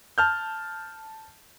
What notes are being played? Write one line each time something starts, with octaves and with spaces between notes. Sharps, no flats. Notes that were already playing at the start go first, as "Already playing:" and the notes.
A5 F6 G6